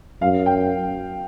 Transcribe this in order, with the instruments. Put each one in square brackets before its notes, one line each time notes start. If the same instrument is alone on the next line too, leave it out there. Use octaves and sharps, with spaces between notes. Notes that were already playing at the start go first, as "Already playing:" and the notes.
[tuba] F#2 [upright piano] F5
[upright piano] G5